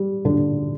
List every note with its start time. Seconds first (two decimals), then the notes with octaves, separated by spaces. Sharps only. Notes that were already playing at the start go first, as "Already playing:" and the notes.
Already playing: G3
0.25 D3